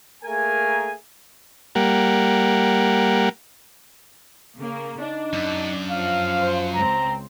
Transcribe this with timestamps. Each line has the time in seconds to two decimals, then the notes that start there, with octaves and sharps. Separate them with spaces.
0.24 A3 A#3 G#4 A#4 G#5
1.75 G3 A#3 F#5
4.57 C#3 A#3
5.01 D4 D#4
5.33 F#2
5.91 F3 F5
6.38 C5
6.74 C#2 C4 A#5